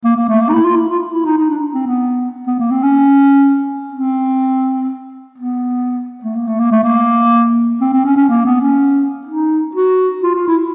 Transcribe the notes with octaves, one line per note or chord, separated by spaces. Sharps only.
A#3
A#3
A3
A#3
D#4
E4
F4
E4
F4
E4
D#4
D#4
D4
C4
B3
B3
A#3
C4
C#4
C4
B3
A3
A#3
A3
A#3
A3
A#3
C4
C4
C#4
C#4
A#3
B3
C#4
D#4
F#4
F4
F4
E4